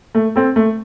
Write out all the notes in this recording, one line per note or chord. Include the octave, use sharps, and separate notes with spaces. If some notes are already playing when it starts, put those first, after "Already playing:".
A3
C4 A4
A3